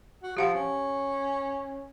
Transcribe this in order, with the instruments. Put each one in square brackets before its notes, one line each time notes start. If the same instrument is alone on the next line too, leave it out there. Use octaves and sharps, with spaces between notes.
[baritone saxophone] F#4
[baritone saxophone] F3 [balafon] G4 F5 F#5
[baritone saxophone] C#4